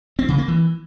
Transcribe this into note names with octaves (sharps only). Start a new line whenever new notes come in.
C4
C#3
A#3
E3